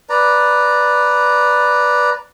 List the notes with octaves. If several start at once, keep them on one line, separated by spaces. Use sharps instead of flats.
B4 D5 A#5